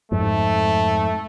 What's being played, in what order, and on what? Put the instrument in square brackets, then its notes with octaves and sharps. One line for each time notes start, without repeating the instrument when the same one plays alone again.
[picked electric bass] F2 G#2 [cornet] A3